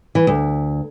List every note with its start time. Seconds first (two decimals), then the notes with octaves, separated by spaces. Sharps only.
0.15 E3
0.27 D2